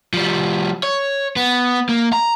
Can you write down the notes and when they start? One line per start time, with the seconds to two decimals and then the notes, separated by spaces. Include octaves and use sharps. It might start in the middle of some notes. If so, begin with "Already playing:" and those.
0.13 F3 G3
0.83 C#5
1.36 B3
1.89 A#3
2.13 A#5